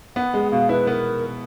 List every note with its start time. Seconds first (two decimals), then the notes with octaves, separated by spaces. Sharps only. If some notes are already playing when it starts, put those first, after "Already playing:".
0.16 B3 F#5
0.34 G#3
0.51 B2 F5
0.69 E4 B4
0.87 B3 A#4